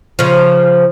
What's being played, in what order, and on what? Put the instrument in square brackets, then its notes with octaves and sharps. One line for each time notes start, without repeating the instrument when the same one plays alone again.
[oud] C#3 F3